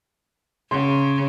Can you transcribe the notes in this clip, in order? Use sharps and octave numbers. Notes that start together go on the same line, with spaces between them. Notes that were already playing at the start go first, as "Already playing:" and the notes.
C#3 C6